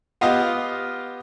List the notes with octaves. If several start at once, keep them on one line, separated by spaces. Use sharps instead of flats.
B3 F4 G4 D#5 F5